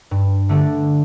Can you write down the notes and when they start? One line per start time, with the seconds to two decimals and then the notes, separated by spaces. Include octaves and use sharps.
0.11 G2
0.49 D3 A3 D4 A4